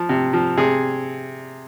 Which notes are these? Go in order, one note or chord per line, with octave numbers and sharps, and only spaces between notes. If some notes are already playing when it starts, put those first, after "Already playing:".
Already playing: F3
C3
F3
C3 G#4